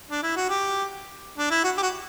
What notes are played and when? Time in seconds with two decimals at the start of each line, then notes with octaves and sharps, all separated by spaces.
0.11 D4
0.23 E4
0.37 F#4
0.50 G4
1.38 D4
1.51 E4
1.64 F#4
1.78 G4
1.82 F#4